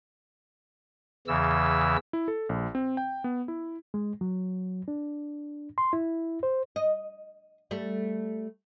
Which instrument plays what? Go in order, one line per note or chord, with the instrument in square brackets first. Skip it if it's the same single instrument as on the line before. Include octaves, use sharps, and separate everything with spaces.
[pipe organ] E2 C#3 E3 E6
[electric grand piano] E4
A4
A#1
C4
G5
B3
E4
[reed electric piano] G#3
F#3
D4
C6
E4
C5
[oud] D#5
G3 A3